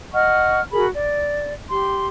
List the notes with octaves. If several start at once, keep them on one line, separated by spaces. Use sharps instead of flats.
D#5 F#5 C#6 F6
F#4 G#4 A#4 B5
D5
G4 C6